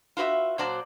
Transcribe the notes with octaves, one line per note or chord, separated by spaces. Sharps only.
F4 F#4 B4 D#5 E5
A#2 F#3 F#4 C5 D5 A5